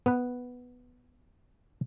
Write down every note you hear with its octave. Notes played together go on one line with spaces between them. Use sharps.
B3 B4